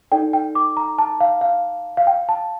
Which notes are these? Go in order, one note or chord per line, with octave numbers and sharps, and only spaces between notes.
D#4 A4 D5 G5
G5
D6
A#5
A5
F5
F5
F5
G5
A5